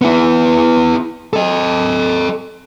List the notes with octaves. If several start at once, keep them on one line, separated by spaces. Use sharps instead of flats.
B3 E4
A4 D#5